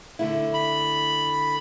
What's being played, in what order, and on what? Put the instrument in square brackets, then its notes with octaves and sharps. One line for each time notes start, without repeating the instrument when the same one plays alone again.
[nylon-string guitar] D3 A3 E4
[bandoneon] B5